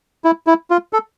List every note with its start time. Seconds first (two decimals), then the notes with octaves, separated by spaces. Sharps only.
0.24 E4
0.47 E4
0.70 F4
0.93 A4